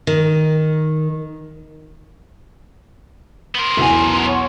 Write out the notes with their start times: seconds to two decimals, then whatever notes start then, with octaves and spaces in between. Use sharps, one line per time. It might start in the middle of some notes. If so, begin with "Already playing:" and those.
0.07 D#3
3.55 B3 A#4 C6
3.77 B1 E2 B2 E4 G#5
4.27 C#5 F#5 C#6